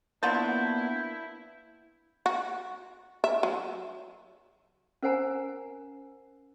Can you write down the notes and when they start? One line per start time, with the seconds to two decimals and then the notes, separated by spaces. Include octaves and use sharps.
0.23 F#3 A#3 B3 D4 E4 F4 A5 G6
2.26 F#4
3.24 E5
3.43 F#3
5.03 C#4 A#4 C5 F#5 G#5 A#5